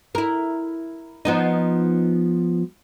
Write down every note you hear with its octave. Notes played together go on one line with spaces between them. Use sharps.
E4 A#4
F3 B3 D#4